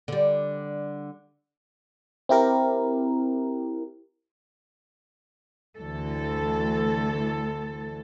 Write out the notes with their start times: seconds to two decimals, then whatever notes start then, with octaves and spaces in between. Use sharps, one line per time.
0.08 D3 G3
2.29 C4 E4 G4 A#4
5.77 D2 E3 A4